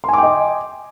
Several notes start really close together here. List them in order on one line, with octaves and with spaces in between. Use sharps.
C6 G#5 D6 G5 D#5